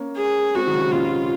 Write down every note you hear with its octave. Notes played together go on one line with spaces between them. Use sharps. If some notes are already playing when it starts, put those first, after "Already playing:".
Already playing: A#3 C#4
G#4
G#3 C4 F#4
D#3 F#3
C#3
C3 D#3
A#2 C#3 F4